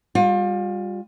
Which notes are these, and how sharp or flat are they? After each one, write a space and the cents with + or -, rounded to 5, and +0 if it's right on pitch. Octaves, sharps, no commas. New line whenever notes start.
G3 +25 F4 +35